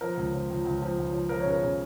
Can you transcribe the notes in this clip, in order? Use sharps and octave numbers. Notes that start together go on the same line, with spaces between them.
F3 A#4
C#2
F3
C#2
C#2
F3
C#2
F3
F3 A#4
C#5
C#3
A#4
C#3